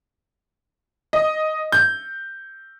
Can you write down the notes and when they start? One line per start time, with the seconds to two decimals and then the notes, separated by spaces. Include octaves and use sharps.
1.13 D#5
1.72 G6